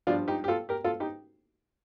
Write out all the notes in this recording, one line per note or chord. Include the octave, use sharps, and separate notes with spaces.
G2 F3 D4 F4
D#4 G4
G4
F4 A4
G4 A#4
F4 A4
D#4 G4